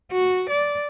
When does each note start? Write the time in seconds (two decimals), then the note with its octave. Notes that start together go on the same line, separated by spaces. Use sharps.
0.12 F#4
0.50 D5